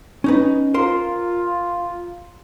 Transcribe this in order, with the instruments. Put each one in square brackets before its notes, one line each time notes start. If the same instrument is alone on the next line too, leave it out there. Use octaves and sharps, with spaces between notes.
[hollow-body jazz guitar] C#4 D#4 B4
[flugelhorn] F4 [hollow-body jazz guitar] A#4 C5 C6